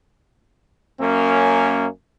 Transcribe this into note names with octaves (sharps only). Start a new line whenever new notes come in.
F#2 A#3 C#4